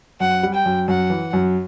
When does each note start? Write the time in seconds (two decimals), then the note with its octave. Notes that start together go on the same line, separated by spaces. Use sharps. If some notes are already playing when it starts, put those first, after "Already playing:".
0.20 F#2 F#5
0.43 G3
0.54 G5
0.66 F#2
0.88 F#2 F#5
1.10 E3
1.33 F#2